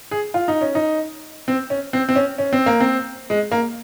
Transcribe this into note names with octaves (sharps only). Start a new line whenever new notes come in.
G#4
F4
D#4
C#4
D#4
C4
C#4
C4
C4
C#4
C#4
C4
A#3
C4
G#3
A#3